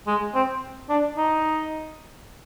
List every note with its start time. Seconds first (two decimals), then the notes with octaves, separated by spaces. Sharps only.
0.07 G#3
0.34 C4
0.89 D4
1.17 D#4